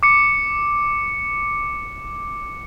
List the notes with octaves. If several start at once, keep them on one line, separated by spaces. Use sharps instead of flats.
D6 C#7